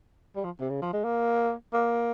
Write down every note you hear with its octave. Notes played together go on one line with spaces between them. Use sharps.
G3
F3
C3
C#3
F3
G#3
A#3
A#3